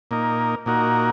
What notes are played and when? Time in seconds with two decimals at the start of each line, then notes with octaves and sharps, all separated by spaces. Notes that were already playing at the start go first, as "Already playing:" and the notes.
0.11 A#2 A#3 D#4 A#4
0.66 A#2 A#3 D#4 F#4 A#4